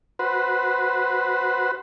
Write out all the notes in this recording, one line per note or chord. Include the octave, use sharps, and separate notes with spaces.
F#4 B4 C5